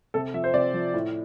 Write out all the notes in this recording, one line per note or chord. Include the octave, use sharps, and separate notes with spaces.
C3 A4
F3 E5
C5
C3 D5
F3
A2